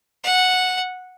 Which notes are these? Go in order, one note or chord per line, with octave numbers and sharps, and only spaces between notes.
F#5